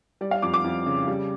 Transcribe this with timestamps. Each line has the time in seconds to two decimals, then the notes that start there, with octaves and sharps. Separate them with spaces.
0.21 G3 D5
0.31 F5
0.42 F2 D6
0.54 D6
0.64 F2
0.86 C#3
1.08 G3